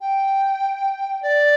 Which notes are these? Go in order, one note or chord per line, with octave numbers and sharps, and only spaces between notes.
G5
D5